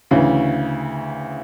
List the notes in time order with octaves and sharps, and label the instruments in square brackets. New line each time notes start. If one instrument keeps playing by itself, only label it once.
[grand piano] D2 C#3 E3